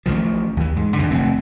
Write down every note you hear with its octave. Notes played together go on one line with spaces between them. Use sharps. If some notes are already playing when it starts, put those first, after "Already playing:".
A1 B2 D#3 F3
D#2 E3
G#2
E2 B2 D3 D#3
F1 A3 C4